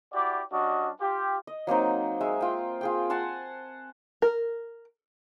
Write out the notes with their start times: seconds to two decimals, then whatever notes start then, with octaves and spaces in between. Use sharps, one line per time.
0.13 E4 F#4 G4 D5
0.52 G3 C#4 D4 F#4 D#5
1.00 F4 G4
1.47 D#5
1.67 F#3 A#3 C4 D#4
2.21 G#3 E5
2.41 F4 G5
2.81 F4 G#4 G5
3.10 F#5 G#5 A5 C6
4.22 A#4